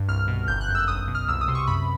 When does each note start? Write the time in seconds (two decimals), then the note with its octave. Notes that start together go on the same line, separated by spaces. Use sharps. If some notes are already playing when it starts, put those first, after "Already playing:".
Already playing: G2
0.08 C2 F6
0.28 B2
0.48 G1 G6
0.61 F#6
0.69 F#2
0.75 E6
0.88 B1 D#6
1.08 B2
1.15 F6
1.28 C2 E6
1.41 D#6
1.48 C3 C6
1.55 C#6
1.68 F#2 B5